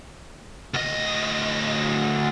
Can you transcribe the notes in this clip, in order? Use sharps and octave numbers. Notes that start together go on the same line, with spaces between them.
D2 D#5